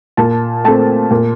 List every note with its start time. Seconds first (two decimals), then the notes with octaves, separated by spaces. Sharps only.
0.17 A#2 A5
0.64 A3 C4 A5
1.10 A#2